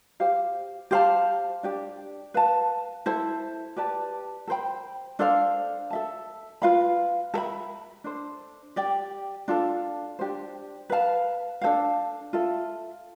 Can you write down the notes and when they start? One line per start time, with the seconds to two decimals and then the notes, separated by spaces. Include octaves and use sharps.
0.20 G4 C5 F5
0.91 G4 C5 F5 A5
1.63 D4 G4 D5
2.34 B4 F5 A5
3.06 E4 A4 C5
3.76 G4 B4 D5 A5
4.47 A4 C5 G5 B5
5.19 D4 A4 C5 F5
5.91 A4 E5 A5
6.62 F4 B4 F5 B5
7.34 A4 E5 B5
8.04 D4 A4 C5
8.76 G4 D5 G5
9.48 D4 F4 A4
10.19 D4 G4 C5
10.90 B4 F5 A5
11.61 D4 A4 C5 F5
12.33 F4 A4 E5